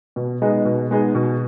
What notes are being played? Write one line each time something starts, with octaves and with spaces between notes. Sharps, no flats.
B2
G#3 B3 D#4 G#4
B2
G#3 B3 D#4 G#4
B2